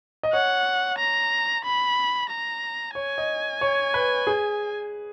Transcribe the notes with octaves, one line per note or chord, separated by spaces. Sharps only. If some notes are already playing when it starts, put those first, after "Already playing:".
D#5
C#5 F#5
A#5
B5
A#5
C#5 G#5
D#5
C#5
B4
G#4